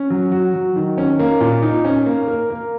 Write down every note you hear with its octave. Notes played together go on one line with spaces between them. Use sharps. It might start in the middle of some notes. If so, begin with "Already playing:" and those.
Already playing: C#4
F#3
F#4
F#3
D#3
C#4
A#3
A#2
D#4
C#4
A#3
A#4
A#3